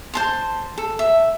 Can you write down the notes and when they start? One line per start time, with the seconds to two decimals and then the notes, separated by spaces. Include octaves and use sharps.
0.14 C5 A5 C6
0.78 A4
0.99 E5